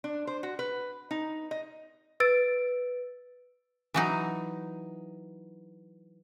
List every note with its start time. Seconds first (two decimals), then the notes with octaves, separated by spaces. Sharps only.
0.04 D4
0.27 C5
0.43 F#4
0.59 B4
1.11 D#4
1.51 D#5
2.20 B4 E6 A6 D7
3.94 E3 F#3 D#4